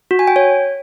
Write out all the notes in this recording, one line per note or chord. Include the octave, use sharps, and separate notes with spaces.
F#4
G#5
G5
C#5